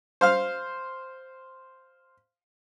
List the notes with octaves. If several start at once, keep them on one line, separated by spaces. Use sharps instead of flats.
C5 F5 F6